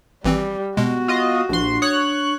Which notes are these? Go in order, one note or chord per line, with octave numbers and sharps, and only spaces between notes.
G#1 E3 G3 C4
B2 G#3 B3 F#4
F4 D#5
A#1 D4 C6
C#5 D#6 F#6